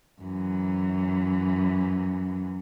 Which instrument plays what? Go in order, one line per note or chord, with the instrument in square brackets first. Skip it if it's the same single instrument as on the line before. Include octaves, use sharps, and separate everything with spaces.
[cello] F#2 E3